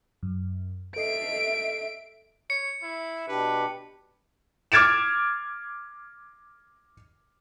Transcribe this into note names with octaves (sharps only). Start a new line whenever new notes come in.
F#2
A4 D#5 E5 C7 D7
C#5 C#7
E4
B2 D4 G4 B4
D6 F6 G#6 A6 D7 E7